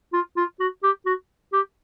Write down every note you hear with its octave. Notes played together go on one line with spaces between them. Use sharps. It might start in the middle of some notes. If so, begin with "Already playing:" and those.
F4
F4
F#4
G4
F#4
G4